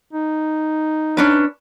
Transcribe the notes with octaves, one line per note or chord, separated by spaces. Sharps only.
D#4
C#4 D4 B4